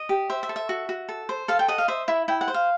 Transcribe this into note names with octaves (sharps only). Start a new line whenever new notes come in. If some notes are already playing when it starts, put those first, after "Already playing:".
Already playing: D#5
G4
C5 E5
E5
A4
E5
F#4
F#4
A4
C5
A4 F5
G5
D#5 F#5
F5
C5 E5
E4 E5
E4 G5
F#5
C5
F5